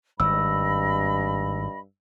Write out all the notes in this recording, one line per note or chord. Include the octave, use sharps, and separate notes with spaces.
G#1 G2 D#5 B5 E6